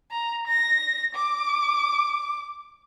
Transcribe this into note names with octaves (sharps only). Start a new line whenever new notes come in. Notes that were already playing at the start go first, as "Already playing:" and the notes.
A#5
A#6
D6